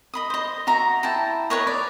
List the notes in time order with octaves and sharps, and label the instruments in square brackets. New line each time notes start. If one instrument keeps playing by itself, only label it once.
[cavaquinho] D#5 B5 D#6
C5 D#5
F#4 E5 A#5
E4 G5 A5
A#4 B4 C#5 D#5
D5